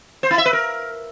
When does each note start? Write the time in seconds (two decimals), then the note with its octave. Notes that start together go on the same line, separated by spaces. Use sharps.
0.23 C5
0.31 E4
0.38 E5
0.46 B4
0.53 A#4